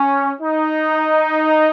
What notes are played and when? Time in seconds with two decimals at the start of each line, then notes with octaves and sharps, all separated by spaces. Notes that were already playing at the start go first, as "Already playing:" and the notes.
Already playing: C#4
0.41 D#4